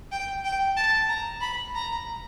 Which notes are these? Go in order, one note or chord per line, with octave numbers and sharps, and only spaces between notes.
G5
G5
A5
A#5
B5
A#5